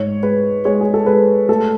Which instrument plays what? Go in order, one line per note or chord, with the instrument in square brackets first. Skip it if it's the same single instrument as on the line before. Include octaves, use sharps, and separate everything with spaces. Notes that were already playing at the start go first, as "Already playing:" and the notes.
Already playing: [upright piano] G#2 C#5
G#3 B4
G#3 C#5
G#4
A4
G#3 B4
A3 A4